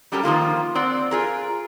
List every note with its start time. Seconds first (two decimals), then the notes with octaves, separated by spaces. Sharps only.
0.12 F#3 G3 C#4 G4 A4 A#4
0.24 D#3 F3 A#3 F4
0.75 C4 D5 F#5
1.11 F4 G#4 A#4